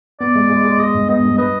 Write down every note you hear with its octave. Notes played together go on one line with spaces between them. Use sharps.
B3 D5
G#3
G#3
G#3
G#3 D#5
G2
B3 D#5
G2
B4 D#5